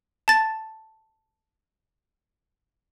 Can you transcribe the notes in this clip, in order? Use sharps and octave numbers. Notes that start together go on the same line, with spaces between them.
A5 A6